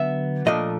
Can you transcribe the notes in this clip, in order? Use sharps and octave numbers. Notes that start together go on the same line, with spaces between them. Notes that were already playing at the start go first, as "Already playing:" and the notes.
Already playing: D3 F#3 B3 D4 E5
A#2 F3 A3 D4 D#5